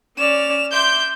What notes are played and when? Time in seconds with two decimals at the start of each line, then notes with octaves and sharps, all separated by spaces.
0.17 C#4 D5 F6 E7
0.73 E5 C6 D6 G6